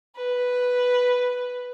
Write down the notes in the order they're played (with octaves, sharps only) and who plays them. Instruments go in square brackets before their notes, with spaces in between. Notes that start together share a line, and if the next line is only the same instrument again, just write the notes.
[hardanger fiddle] B4